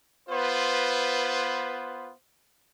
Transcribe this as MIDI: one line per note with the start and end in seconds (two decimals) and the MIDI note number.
0.29 2.12 59
0.29 2.12 65
0.29 2.12 71
0.29 2.12 72